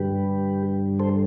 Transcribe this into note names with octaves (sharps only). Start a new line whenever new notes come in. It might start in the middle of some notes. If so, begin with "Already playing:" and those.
Already playing: G2 D3 G3 G4 B4
A4 C5